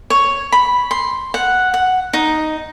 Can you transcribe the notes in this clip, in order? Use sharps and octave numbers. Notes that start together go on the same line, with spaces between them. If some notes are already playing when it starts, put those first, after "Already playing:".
C#5
B5
C6
F#5
F#5
D#4